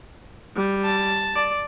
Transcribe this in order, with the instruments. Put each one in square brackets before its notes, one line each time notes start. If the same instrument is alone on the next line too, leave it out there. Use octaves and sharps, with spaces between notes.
[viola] G3
[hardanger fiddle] A5
[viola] D5